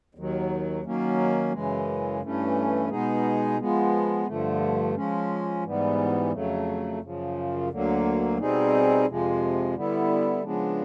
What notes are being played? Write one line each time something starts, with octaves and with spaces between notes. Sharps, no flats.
D#2 D#3 F#3
D#3 F#3 A#3 C#4
F#2 C#3 E3 G#3
G2 E3 A3 C#4
B2 G#3 B3 D#4 G#4
F3 G#3 B3
G2 D3 F3 A3
F3 G#3 C#4
G#2 E3 G3 B3
F2 C#3 F#3 A3
F#2 C#3 F3
D2 D3 F#3 A#3
B2 G3 C4 D#4 G#4
F2 C3 F3 G#3
D3 G3 B3 E4
C#3 F3 G#3 B3 D4